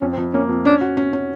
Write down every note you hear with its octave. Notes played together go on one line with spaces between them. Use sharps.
F2 C#4
C4
F2
A#3 C#4
F2
C#4 D4
F#4
C#4
C#4